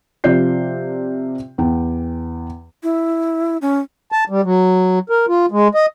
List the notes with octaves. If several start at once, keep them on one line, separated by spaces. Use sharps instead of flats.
C3 F3 F4 D5 G6 C7
E2 G5
E4
C#4
A5
G3
F#3
A#4
F4
G#3
D#5